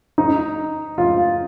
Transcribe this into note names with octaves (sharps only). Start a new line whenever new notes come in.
D#4
F4